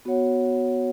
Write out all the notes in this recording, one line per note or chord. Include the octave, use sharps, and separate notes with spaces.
B3 F#4 C#5 F#5